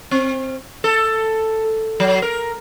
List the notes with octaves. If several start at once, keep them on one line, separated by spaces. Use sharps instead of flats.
C4
A4
F#3
A#4